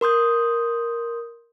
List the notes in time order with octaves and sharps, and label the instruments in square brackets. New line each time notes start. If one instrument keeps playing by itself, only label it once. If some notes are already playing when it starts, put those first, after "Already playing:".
[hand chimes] A#4 C6 D#6 G6